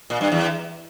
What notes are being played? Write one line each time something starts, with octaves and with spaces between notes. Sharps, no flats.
A#2
G2
E2